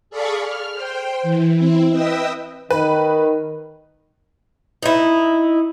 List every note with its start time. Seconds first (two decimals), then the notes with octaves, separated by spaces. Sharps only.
0.10 G#4 A4 D5 F5 B5 C#6
0.42 F6
0.75 C5 G5
1.23 E3
1.55 C4 E4
1.90 B4 D#5 E5 G5 D#6 E6
2.71 D#3 B4
4.83 D#4 E4